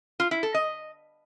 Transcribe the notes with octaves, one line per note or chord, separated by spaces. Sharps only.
F4
E4
A4
D#5